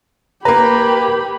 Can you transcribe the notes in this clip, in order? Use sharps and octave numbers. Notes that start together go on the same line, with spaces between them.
A#3 G4 A#4 B4 A#5 B5